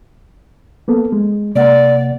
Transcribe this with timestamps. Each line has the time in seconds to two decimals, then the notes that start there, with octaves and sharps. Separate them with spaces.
0.88 A#3 B3 A4
1.12 G#3
1.55 C3 A#3 D5 F#5